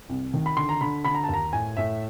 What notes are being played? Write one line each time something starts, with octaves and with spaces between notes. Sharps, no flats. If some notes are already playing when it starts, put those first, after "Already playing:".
C2
D#3
B5
D3 C6
A#5
D3 B5
D3 B5
A#5
A5
D#2 A#5
A2 G#5
A2 E5